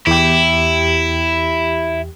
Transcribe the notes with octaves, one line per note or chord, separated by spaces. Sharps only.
E2 E4 G4